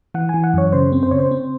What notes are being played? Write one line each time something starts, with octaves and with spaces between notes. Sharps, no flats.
E3 F#5
E3 G#5
F#5
F#2 C#5
C#3 C5
C4
C5
C#3 C#5
C5
C4